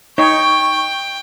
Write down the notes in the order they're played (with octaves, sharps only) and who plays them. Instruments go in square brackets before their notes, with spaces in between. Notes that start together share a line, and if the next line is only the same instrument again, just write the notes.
[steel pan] D#4 C#5 [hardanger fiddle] G5 [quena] C#6